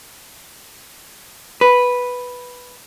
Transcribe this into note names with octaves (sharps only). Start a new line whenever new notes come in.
B4